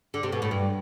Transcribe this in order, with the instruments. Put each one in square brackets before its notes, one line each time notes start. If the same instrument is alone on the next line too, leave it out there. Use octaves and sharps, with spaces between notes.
[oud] D3
C3
B2
A2
G2